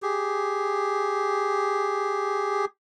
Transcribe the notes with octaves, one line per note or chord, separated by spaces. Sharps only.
G4 G#4